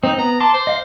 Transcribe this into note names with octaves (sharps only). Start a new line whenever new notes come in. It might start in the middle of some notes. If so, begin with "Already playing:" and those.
C4 D#4
B3 A#5
A5 C6 D6
C5
D#5 F5